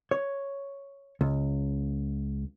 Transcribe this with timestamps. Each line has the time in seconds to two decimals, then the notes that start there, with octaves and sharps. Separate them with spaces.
0.11 C#5
1.21 C#2